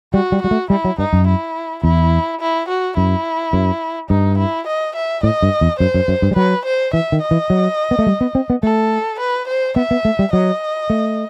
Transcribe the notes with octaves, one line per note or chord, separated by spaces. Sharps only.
G3 F#4
G3
G3 F#4
A3
G3 E4
F#3
G2 D#4
F#2
E4
E2 E4
E4
F#4
F#2 E4
F#2
G2 D#4
E4
D#5
E5
A2 D#5
G2
E2
F#2 C5
F#2
F#2
G2
G3
F#3 B4
C5
E3 E5
D#3
D#5
E3
F#3
B3
A3
G3
B3
C4
B3
A3 A4
B4
C5
B3 E5
B3
A3
G3
F#3 D#5
A3